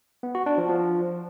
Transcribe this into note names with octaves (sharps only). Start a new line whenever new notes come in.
B3
F#4
D4
F3
F3